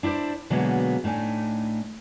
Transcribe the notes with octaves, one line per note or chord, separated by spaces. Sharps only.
D4 E4 B4 C5 D5
B2 D3 F#3 G#3 A#3 B3
A2 A3 D4 D#4 G#5